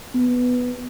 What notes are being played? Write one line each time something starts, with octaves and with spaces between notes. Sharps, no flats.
B3